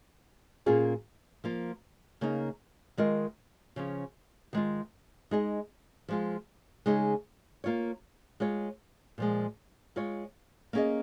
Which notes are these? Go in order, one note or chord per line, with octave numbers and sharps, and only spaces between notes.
A#2 A#3 C#4 F4 G#4
F3 A#3 F4
C#3 A#3 D#4
D#3 G#3 F4 A#4 D#5
C#3 F3 C#4
D#3 G#3 F4
G#3 D#4 G#4 D#5
F3 G#3 F4
C#3 G#3 D#4 G#4
A#3 F4 C#5
G#3 F4 C#5
A#2 F3 G#3
G#3 F4 C#5
A#3 C#4 G#4 D#5